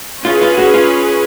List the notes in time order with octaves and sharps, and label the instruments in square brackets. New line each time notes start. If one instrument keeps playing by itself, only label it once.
[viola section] C#4 G#4 B4 [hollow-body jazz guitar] F4
[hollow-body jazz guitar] F4
F#4
F4